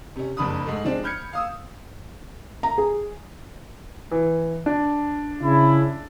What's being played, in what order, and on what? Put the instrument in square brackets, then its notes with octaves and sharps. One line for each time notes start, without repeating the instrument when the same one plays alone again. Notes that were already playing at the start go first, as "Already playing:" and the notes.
[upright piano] C3 C#4
F#1 F2 D4 B5 D#6
G#2 G#3 A3
F3 G#3 C4 D4
B5 F6 G6 G#6 C#7
F5 D#6 E6
[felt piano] A#5
G#4
[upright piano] E3
D4
[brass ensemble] C#3 E4